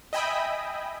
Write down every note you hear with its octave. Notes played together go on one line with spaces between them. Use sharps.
D#5 E5 G5 G#5 B5 D#6